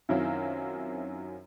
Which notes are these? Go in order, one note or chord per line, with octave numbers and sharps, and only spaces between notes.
F#2 D#3 F#3 C4 E4 F4